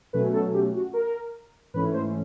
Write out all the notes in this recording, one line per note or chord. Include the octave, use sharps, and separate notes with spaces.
B2 F#3 A3 C#4 B4
A4
G4
F#4
A#4
G#2 E3 A3 C#4 B4
C5